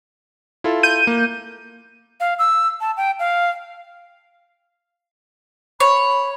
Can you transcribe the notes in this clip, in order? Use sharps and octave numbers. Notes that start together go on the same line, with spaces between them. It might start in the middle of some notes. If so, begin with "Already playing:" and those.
E4 F4 A4
G6 D#7
A#3
F5
E6
A5
G5
F5
C#5 B5